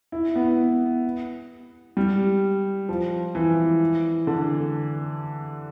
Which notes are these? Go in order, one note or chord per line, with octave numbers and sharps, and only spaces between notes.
E4
B3
G3
F3
E3
D3